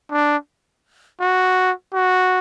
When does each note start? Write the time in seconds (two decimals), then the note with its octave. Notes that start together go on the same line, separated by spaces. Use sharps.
0.11 D4
1.20 F#4
1.94 F#4